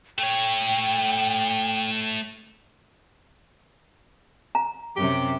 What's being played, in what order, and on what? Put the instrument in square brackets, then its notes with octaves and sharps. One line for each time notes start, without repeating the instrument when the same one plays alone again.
[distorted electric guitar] A3 C#5 [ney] G5
[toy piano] A#5
[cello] F#2 C3 [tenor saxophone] G4